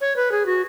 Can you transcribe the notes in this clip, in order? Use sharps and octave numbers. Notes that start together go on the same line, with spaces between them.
C#5
B4
G#4
F#4